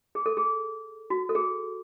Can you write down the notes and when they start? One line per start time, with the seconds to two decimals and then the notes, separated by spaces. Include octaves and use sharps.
0.15 G#4
0.26 A4
0.37 G#4
1.10 F#4
1.29 A4
1.35 G#4